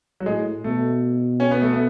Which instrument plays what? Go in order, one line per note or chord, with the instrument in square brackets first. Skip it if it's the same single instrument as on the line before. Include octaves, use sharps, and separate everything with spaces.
[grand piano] F#3
[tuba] A2 [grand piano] G#3
[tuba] B2 [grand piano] A3
[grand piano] C#4
B3
A3
B3